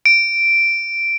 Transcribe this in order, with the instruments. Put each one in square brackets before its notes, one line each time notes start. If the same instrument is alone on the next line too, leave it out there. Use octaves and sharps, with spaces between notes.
[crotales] D7